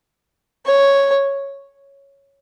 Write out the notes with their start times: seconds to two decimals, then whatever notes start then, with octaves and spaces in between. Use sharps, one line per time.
0.66 C#5